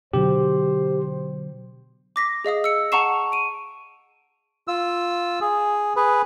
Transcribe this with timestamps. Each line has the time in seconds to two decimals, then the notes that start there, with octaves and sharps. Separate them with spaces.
0.13 B2 D3 F#3 G4 C5
2.16 D6 A#6 B6
2.45 G#4 D#5 F5 D#6
2.64 E6 C#7
2.92 F#5 A5 A#5 C#6 C7 E7
3.32 D7 D#7
4.68 F4 E6
5.41 G#4
5.96 G#4 B4